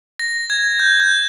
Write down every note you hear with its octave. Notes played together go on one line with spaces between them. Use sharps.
A#6
G#6
G6
G6